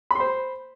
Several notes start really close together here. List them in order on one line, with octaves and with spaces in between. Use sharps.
B5 C6 C5